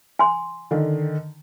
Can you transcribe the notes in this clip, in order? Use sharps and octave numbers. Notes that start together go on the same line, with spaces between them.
G#5 C6
D3 D#3